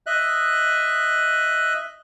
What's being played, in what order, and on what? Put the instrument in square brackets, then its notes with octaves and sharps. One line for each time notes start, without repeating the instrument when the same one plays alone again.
[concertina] D#5 E5 F#6